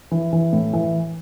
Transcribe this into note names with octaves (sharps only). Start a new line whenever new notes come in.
E3
E3
A2
E3